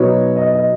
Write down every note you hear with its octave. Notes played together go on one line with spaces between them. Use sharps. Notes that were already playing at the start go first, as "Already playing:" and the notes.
Already playing: B2 F#3 B3 D#4 C#5
D#5
D#5